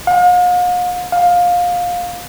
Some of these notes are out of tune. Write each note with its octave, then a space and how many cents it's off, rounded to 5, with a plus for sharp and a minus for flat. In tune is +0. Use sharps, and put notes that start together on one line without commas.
F5 +45
F5 +20